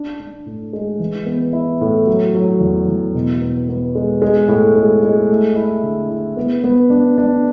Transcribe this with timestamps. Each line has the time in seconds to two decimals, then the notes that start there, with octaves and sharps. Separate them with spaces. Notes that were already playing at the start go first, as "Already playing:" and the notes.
Already playing: D4
0.20 D4
0.46 A2
0.73 G#3
1.00 E3
1.26 B3
1.53 E4
1.81 A2
2.07 F#3
2.35 F#3
2.60 E2
2.88 E2
3.15 B2
3.41 B3
3.69 B3
3.95 G#3
4.22 G#3
4.48 A2
4.76 G#3
5.03 G#3
5.29 A3
5.56 E4
5.83 D3
6.09 E4
6.37 B3
6.64 B3
6.90 D4
7.18 D4